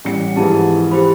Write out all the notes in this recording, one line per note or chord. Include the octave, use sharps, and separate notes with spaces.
A1 G3 C#7
F2 G#2 E3 G4 A5
G4 C5 B5